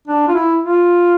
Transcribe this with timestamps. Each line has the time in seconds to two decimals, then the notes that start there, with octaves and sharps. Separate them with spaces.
0.07 D4
0.28 F4
0.35 E4
0.63 F4